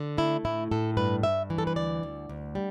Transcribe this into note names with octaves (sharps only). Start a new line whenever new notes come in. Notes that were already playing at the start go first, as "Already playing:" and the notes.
Already playing: D3
A3 E4
A2 E4
A2 A4
G2 B4
G2 E5
E3
A4
B4
D2 D5
D2
D2
G3